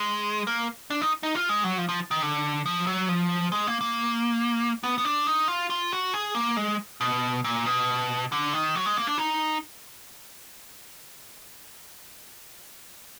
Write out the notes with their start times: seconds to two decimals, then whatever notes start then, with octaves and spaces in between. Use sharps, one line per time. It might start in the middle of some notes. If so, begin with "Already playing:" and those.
Already playing: G#3
0.47 A#3
0.90 D4
1.01 D#4
1.23 D#4
1.35 F4
1.49 G#3
1.64 F#3
1.78 F3
1.89 F3
2.11 D#3
2.22 D3
2.66 F3
2.87 F#3
3.08 F3
3.52 G#3
3.67 A#3
3.81 A#3
4.84 B3
4.98 B3
5.05 D4
5.27 D#4
5.48 F4
5.70 F4
5.92 F#4
6.14 G#4
6.35 A#3
6.57 G#3
7.01 B2
7.44 A#2
7.66 B2
8.32 D3
8.53 D#3
8.75 F#3
8.86 G#3
8.97 A#3
9.07 D4
9.18 D#4